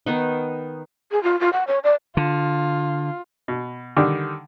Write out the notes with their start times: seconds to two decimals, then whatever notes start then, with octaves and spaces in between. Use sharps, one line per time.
0.06 D#3 B3 D#4
1.12 G#4
1.23 F4
1.40 F4
1.53 F#5
1.67 C#5
1.84 D5
2.17 D3 F4
3.48 B2
3.97 D3 D#3 G3